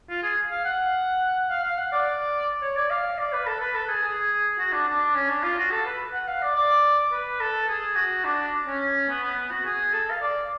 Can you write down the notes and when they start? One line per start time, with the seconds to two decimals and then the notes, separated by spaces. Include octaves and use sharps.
0.09 F4
0.23 G#4
0.51 F5
0.65 F#5
1.50 F5
1.64 F5
1.77 F#5
1.92 D5
2.62 C#5
2.76 D5
2.90 F5
3.18 D5
3.33 B4
3.47 A4
3.60 B4
3.75 A4
3.89 G#4
4.03 G#4
4.59 F#4
4.72 D4
4.87 D4
5.15 C#4
5.29 D4
5.43 F4
5.58 F#4
5.71 A4
5.86 B4
6.13 F#5
6.28 F5
6.42 D5
6.55 D5
7.12 B4
7.40 A4
7.68 G#4
7.96 F#4
8.25 D4
8.67 C#4
9.09 B3
9.23 B3
9.37 B3
9.51 F#4
9.65 G#4
9.93 A4
10.11 F5
10.21 D5